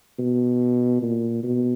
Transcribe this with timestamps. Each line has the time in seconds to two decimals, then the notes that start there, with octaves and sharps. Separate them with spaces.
0.19 B2
1.02 A#2
1.43 B2